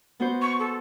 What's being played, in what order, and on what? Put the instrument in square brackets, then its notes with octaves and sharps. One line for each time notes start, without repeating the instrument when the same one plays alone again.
[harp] B3 F#4 C5
[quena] C#6
A4